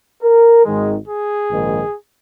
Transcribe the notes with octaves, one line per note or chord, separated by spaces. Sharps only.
A#4
G#1 G#2 D#3 G#3
G#4
A#1 G#2 D#3